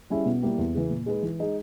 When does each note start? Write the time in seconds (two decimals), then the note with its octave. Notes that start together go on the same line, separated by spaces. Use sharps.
0.10 G3 C#4 E4 G#4
0.26 B2
0.43 G3 A#3 E4 G4
0.58 E2
0.75 C#3 E3
0.90 A#2
1.06 G#3 D#4 G#4 B4
1.23 E3
1.39 G#3 D#4 G#4